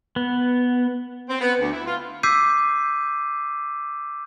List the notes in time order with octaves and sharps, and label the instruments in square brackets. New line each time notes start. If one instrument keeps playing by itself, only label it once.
[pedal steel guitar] B3
[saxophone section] C4
B3
D2
E4
F4
[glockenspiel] D6 E6 G6 B6 C7 D#7